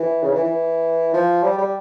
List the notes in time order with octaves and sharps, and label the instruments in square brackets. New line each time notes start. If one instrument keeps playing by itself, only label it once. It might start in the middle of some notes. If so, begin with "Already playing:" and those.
Already playing: [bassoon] E3
C#3
E3
E3
F3
G3
G3